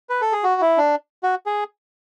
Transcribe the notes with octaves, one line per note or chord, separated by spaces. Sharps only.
B4
A4
G#4
F#4
E4
D4
F#4
G#4